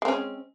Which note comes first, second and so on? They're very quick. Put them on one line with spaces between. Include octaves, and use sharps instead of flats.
G#3 C4 C#4